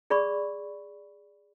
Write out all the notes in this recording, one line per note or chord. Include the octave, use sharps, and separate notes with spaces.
G#4 D5 B5 C#6